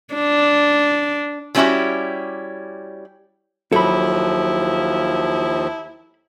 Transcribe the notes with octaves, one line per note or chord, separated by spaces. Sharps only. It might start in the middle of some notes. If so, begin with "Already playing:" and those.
D4
F3 G3 C#4 E4 F#4 G4
D#2 F3 F#3 E4 A4 B5